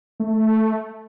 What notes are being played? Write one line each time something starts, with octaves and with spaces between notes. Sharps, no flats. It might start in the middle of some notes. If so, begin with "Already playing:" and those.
A3